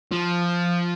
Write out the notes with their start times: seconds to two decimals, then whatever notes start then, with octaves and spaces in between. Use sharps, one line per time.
0.12 F3